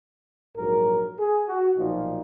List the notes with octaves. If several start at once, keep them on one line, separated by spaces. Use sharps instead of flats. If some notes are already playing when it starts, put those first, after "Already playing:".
A#1 G#2 F#3 A#4
G#4
F#4
B1 A#2 F3 D#4